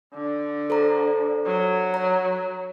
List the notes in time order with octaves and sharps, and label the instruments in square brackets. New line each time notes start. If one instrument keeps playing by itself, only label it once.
[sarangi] D3
[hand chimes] A4 C5 A#5
[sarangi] F#3
[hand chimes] C#5 A#5